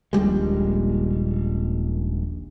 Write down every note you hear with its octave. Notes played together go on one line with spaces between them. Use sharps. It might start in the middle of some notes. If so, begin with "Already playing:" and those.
D#1 A#1 G3 G#3